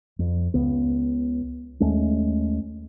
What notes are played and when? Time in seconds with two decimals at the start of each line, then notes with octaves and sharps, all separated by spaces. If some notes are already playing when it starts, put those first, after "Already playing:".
0.19 F2
0.54 C#2 C#3 B3
1.80 D#2 G#3 A3 C#4